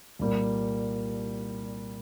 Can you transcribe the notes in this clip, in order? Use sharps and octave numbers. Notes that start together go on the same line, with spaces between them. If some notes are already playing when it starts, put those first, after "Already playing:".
C2 A#2 G3 A#3